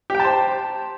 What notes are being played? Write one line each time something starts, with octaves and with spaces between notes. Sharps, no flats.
G4 C5 G5 A5